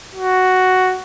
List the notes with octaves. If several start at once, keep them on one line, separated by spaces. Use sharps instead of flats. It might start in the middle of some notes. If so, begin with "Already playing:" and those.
F#4